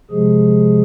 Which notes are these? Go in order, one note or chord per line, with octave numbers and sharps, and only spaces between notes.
C3 F3 G#3 G#4